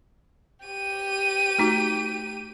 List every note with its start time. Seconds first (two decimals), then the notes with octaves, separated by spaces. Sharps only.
0.66 G4 D#7
1.58 A3 D#4 F#4